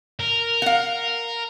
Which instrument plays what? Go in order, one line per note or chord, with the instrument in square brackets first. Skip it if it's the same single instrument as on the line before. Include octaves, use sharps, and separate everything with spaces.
[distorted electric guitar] A#4
[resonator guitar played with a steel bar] F5 F#5